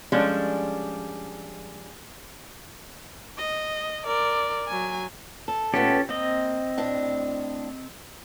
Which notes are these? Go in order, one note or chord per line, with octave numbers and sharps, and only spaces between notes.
F3 G3 G#3 C#4 D4 A4
D#5
A#4 D5
F#3 G#5
A4
A#2 A3 B3 C#4 G4 A4
A#3 C4 D#5
A2 D4